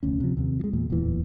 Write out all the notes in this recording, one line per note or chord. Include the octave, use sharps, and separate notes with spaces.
F1 D2 C#4
C3 F3
D#2 C3
F3 G#3
E2 A#2
D1 E2 A#2 E3